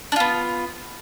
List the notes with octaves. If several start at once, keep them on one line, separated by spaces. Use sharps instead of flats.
B3 D4 F4